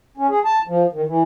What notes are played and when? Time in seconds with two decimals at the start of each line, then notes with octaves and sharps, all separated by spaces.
0.17 C#4
0.29 G#4
0.45 A5
0.67 F3
0.93 D#3
1.07 E3